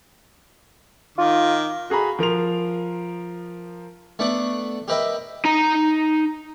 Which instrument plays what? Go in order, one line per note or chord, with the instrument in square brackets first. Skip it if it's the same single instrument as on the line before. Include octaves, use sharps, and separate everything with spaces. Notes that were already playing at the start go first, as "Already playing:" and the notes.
[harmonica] D#3 D6 [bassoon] F4
[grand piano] F#4 G#4 A#5 B5
F3 A#4 C6 F7
[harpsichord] A3 B3 D4 D5 F#5
G4 A#4 B4 D#5 E5 G5
[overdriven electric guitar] D#4 A#5